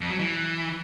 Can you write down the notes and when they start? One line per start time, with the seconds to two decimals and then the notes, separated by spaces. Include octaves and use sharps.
0.01 F2
0.10 F#3
0.19 E3